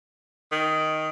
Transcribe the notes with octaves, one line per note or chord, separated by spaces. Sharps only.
D#3